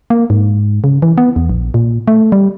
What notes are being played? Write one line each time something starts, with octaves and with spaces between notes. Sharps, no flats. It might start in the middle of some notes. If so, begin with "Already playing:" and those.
A#3
G#2
C#3
E3
B3
E2
A#1
A#2
A3
G3